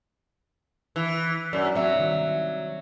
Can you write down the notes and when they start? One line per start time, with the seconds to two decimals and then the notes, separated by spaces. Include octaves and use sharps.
0.96 E3
1.53 F#2 D5
1.75 F#3 C4 E5
1.96 D#3 G3